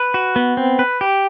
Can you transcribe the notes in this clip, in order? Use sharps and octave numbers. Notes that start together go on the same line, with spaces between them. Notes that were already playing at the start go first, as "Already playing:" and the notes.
Already playing: B4
F#4
B3
C4
B4
G4